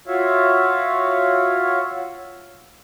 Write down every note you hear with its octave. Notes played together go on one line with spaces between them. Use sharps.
F4 F#4 C#5 E5 F5